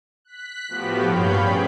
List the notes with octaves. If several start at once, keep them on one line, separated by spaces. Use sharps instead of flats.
F#6 B6
A2 F3 B3 F#4 G4
G2 A#2 C#5 F5 B5 G6
C#4 G#4 D5 G5 B5